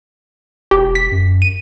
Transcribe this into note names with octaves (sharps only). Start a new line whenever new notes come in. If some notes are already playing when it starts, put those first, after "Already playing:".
E1 G4
B6
F#2
D#7